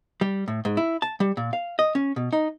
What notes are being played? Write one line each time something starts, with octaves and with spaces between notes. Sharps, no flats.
G3
A2
G#2
E4
A5
G3
A#2
F5
D#5
C#4
B2
D#4